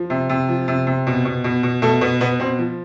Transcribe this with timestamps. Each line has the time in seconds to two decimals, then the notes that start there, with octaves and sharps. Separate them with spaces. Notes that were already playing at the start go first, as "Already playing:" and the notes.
Already playing: F3
0.10 C3
0.30 C3
0.48 F3
0.68 C3
0.87 C3
1.07 B2
1.25 B2
1.44 B2
1.63 B2
1.82 B2 A3 A4
2.01 B2 B3
2.21 B2 B3
2.40 B2 C4
2.58 F3